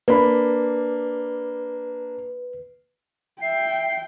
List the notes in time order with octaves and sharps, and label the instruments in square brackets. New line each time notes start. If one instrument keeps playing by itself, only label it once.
[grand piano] A#3 D4 B5 [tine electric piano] B4
[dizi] E5 [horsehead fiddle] G5 [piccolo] C7